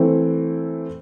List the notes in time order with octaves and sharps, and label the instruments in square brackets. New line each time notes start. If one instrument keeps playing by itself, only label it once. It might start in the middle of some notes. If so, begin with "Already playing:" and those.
Already playing: [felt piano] E3 A3 C4